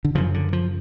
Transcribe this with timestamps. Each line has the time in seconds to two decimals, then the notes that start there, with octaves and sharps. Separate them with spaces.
0.05 D3
0.15 F#2 C#3 F3
0.34 D3
0.53 F3